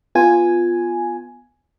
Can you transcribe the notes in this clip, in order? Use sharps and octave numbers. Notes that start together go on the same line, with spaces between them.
B3 F4 G#5